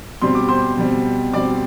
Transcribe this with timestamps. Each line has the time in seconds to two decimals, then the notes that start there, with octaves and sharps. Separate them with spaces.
0.22 B2 G3 C4 C6
0.35 D6
0.48 C5 C6
0.77 B2 G3 C4
1.33 B2 G3 C4 D5 D6